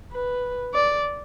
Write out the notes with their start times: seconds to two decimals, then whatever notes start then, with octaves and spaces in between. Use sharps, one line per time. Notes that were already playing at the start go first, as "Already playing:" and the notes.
0.12 B4
0.74 D5